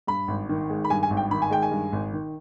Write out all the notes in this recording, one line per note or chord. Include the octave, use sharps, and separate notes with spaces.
G2 B5
G#1
D#3
G#3
B5
G2 G#5
G#5
G#1
G5
D#3 B5
G#5
G#3 G5
G#5
G2
G#1
D#3